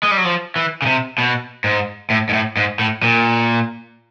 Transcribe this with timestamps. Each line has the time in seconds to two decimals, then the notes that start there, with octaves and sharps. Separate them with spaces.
0.03 G#3
0.11 G3
0.17 F#3
0.25 F3
0.56 E3
0.82 C#3
0.86 C3
1.18 B2
1.64 G#2
2.10 A2
2.29 G#2
2.33 A2
2.57 G#2
2.79 A2
3.02 A#2